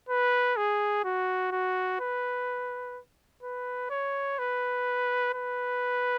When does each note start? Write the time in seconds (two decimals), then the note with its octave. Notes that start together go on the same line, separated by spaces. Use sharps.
0.09 B4
0.57 G#4
1.04 F#4
1.52 F#4
2.00 B4
3.43 B4
3.90 C#5
4.39 B4
5.34 B4